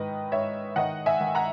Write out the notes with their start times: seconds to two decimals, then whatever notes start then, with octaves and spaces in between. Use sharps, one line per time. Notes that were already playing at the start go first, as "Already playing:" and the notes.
Already playing: G#2 D#3 B4 D#5
0.32 G#2 C#5 E5
0.76 D#3 D#5 F#5
1.06 E5 G#5
1.21 D#3
1.35 F#5 A#5